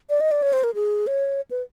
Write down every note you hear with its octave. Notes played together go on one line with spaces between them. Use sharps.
D5
D#5
D5
C#5
C5
A#4
G#4
C#5
B4